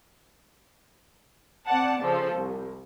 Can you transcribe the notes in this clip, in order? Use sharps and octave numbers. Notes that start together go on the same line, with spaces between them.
C4 D5 F#5 A5
C#3 F3 A4
C2